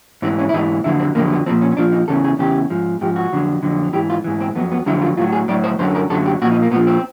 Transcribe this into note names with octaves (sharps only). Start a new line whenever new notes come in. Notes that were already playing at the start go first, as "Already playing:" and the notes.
G#2 E3 C4
C#4
E4
G#2 E3 D#4
F2 D3 F#3 E4
C4
F2 D3 F#3 A#3
B3
A#2 F3 C4
C#4
C#4
A#2 F3 D4
D#4
E2 C#3 E3 A4
G#4
E2 C#3 E3 G4
G#2 F3
G#2 F3 G4
F#4
F2 D3 F#3
F2 D3 F#3
G#2 E3 G4
F4
G#2 E3
C4
F2 D3 F#3 B3
B3
F2 D3 F#3 E4
F4
A2 F#3 F4
G#4
A2 F#3 D5
C5
F#2 D3 F#3 C5
A#4
F#2 D3 F#3 A4
G4
A#2 F3 F#4
D#4
A#3
A#2 F3 B3
C4